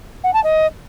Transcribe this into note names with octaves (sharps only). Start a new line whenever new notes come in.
F#5
A5
D#5